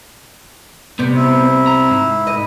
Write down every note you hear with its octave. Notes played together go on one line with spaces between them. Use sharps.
C3 G3 B3
E4
A#5
G#2
D#5